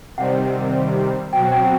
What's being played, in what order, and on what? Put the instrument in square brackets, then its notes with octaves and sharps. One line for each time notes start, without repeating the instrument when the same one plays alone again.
[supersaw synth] C3 D#3 G3 C4 [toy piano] F#5
[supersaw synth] B2 F#3 C4 F#4 [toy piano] G5
[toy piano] G5